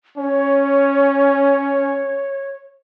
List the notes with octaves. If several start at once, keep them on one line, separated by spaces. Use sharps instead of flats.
C#4 C#5